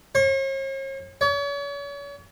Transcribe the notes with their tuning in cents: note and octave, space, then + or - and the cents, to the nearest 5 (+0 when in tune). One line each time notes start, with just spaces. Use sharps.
C#5 -45
C#5 +40